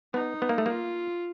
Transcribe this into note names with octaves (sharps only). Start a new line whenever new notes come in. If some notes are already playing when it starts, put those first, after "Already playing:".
B3 D#4
B3
A#3
A3
A#3 F4